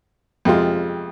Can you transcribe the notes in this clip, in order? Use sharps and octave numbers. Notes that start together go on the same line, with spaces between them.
F2 C3 G#3 F4